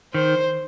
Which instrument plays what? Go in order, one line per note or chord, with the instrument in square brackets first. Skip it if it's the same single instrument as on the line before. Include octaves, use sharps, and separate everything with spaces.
[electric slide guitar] D#3 [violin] C5